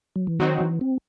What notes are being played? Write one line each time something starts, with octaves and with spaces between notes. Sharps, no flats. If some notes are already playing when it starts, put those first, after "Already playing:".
F#3
E3
D#3 F#3 C4 D#4 F#4
E3
C4